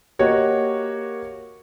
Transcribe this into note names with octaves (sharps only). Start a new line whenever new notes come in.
A#3 F#4 G4 C#5 D#5